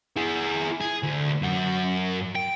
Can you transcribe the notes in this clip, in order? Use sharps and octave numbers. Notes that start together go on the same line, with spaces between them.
E4 G#4
G#4
D2
F#2 F#4
G5